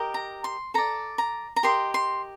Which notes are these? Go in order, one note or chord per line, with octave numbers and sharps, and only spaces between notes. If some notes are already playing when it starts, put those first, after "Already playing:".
Already playing: G4 A#4 D#5
A#5
C6
A4 D5 A#5
A#5
A#5
G4 A#4 D#5 C6
C6